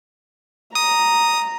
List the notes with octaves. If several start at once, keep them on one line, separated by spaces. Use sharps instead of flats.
A#5 D#6